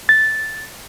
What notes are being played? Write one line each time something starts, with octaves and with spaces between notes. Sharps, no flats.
A6